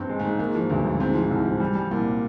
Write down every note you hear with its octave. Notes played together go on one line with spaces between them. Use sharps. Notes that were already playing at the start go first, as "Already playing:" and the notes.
Already playing: G2 C4
G#3
G#2
G#3
G#2 A#3
F3
D2 G2
D2
G#2 C4
F3
C2
F3
G3
G3
C2 A#2